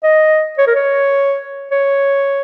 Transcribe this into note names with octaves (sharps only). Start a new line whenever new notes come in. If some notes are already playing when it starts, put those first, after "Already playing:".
D#5
C#5
A#4
C#5
C#5